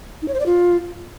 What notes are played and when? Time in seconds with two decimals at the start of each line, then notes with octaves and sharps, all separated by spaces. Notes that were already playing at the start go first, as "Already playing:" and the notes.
0.22 D#4
0.28 C#5
0.34 C5
0.40 D5
0.46 F4